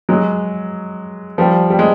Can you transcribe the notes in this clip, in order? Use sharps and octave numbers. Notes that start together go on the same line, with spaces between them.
F#3 G#3
F3 G3
G3
G#3